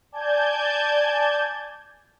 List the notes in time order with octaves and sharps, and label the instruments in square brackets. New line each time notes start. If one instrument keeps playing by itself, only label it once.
[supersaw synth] D5 G#5 A5 G6 G#6